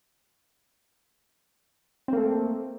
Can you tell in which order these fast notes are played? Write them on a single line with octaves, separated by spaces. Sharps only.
C4 A#3 A3